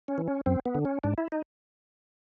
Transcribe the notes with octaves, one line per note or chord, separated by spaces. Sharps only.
C#4
E3
C#4
F#2 C4
B3
D3
C#4
G#2 D4
E4
D#4